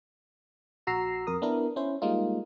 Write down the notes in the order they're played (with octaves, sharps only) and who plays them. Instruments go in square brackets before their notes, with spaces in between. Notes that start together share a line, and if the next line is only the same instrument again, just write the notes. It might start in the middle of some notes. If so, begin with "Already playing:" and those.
[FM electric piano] A#1 F#4 A#5 E6 C7
F2 A#4 D#6
B3 D4 E4 A#4
C#4 E4 C5
G3 G#3 A#3 D#4 F4